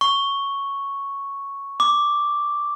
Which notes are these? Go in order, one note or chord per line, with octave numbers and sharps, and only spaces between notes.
C#6
D6